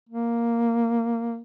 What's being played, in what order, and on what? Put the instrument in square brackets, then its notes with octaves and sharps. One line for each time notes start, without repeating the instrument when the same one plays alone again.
[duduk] A#3